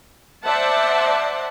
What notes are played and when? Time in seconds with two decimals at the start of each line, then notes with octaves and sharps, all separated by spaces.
0.45 C5 D5 E5 F#5 A5